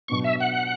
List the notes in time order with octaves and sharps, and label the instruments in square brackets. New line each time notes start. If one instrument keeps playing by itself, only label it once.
[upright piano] B2 F#3 B3 D4 [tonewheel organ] C#6
[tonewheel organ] E5
F#5